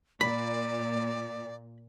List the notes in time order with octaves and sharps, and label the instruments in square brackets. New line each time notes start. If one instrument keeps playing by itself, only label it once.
[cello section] A#2 [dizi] D5 [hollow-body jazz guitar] B5